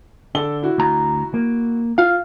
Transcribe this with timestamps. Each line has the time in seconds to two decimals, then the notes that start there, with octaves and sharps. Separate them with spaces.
0.35 D3 A4 G7
0.63 E4 F#4
0.78 D2 A#5
1.34 A#3
1.98 F4 F5